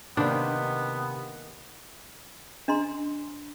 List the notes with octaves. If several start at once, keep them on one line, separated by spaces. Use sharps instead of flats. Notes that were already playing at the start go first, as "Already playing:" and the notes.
C3 D#3 A#3 B3 D4 D#4
D4 D#5 A#5 C6